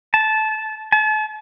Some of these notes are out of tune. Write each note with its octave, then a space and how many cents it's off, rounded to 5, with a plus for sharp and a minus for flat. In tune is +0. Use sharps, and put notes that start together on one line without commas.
A5 -15
A5 -40